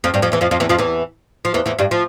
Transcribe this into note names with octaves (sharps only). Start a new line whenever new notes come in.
F2 F3
G2 G3
F2 F3
E2 E3
F2 F3
F2 F3
E2 E3
F2 F3
E2 E3
F3
E2 E3
E2 E3
G2 G3
F3